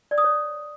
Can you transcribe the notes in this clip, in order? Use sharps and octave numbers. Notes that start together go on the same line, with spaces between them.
D5
D#6
C#5